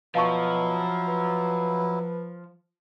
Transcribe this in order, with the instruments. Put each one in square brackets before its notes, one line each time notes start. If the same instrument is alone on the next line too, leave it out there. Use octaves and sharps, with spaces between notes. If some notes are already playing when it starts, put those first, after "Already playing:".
[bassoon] B2 [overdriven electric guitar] F3 [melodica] F#3 E4 [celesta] F5 A5 C#6
[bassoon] B4